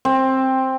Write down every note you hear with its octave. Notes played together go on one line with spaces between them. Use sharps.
C4